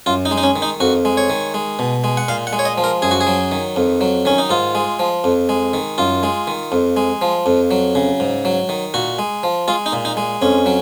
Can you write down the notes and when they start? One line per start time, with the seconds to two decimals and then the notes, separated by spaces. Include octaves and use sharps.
0.06 F#2 F4
0.25 D#4
0.31 G#3
0.38 D#4
0.43 C#4
0.56 D#3
0.62 D#4
0.80 F2 F#4
1.05 G#3
1.17 C#5
1.30 D#3
1.54 G#3
1.79 B2
2.04 G#3
2.17 F#5
2.28 A#2 F5
2.47 F#5
2.53 G#3
2.59 C#5
2.65 D#5
2.78 F3
2.84 A#4
3.02 F#2 G#4
3.11 F#4
3.21 G#4
3.27 F#3
3.51 D#3
3.76 F2
4.01 F#3
4.25 D#3 C#4
4.38 D#4
4.50 G#2 F4
4.75 G#3
4.99 F3
5.24 F2
5.49 G#3
5.73 D#3
5.98 F#2 F4
6.23 G#3
6.47 D#3
6.72 F2
6.97 G#3
7.22 F3
7.46 F2
7.71 F#3
7.95 C#3
8.20 G#2
8.45 F#3
8.69 D#3
8.94 A#2 F#4
9.19 G#3
9.43 F3
9.68 G#3 F4
9.86 D#4
9.92 A#2
10.05 D#4
10.17 G#3
10.42 F2 C#4
10.66 F#3